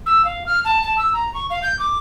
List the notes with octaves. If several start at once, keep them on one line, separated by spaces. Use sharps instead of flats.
E6
F5
F6
A5
A5
E6
A#5
C#6
F5
G6
D6